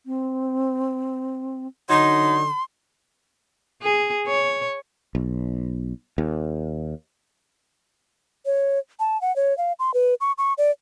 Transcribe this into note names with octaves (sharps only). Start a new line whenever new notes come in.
C4
D3 F#3 D#4 C6
G#4
C#5
B1
D#2
C#5
A5
F#5
C#5
F5
C6
B4
C#6
C#6
D5